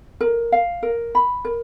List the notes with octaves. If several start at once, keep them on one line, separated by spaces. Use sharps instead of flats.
A#4
F5
A#4
B5
A#4